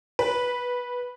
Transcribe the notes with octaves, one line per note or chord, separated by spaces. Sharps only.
B4